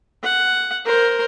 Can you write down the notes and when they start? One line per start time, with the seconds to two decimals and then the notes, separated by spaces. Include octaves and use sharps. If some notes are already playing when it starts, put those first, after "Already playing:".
0.23 F#5
0.86 A#4 C5